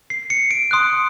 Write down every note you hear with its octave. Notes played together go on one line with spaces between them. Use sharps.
C7
C#7
D7
C6 D#6 F#6